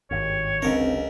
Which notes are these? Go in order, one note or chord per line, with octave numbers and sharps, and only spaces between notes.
G#1 G2 C#5
F#1 C#2 C3 C4 D4 A#4